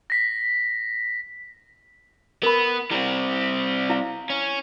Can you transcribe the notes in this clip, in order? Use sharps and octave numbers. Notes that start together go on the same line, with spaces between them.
A#6 B6
B3 A#4 B5
G3 C4 E4
E4 F5
C#4